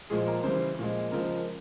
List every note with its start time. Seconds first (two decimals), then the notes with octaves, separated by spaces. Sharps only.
0.10 A#2 F3 G#3 G#4
0.27 A#4
0.44 C#3 E3 G3 C5
0.79 A#2 F3 G#3
1.12 C#3 F3 G#3 A#4